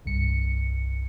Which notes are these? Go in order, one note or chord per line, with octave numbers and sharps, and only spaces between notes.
C2 G2 C#7